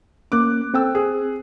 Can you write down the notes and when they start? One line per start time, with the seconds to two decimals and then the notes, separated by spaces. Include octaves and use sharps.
0.32 A#3 C#4 D6 F#6
0.74 C4 A4 G5 E6
0.95 G#4